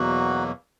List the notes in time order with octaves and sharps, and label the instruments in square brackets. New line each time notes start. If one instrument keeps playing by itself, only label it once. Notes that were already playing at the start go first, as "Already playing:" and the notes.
Already playing: [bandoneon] E2 B2 F#3 A#3 F#4